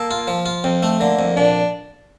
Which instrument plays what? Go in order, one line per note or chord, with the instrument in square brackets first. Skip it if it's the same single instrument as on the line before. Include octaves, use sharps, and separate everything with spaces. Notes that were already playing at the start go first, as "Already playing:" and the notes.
Already playing: [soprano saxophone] A#3 [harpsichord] A4
[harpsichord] F4
F3
F4
[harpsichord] F2 [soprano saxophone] C4
[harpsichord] A3
[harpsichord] D3 [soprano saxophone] A#3
[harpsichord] F2
[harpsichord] A#2 [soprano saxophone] D4